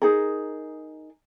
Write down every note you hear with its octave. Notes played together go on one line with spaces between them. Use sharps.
D#4 G#4 A#4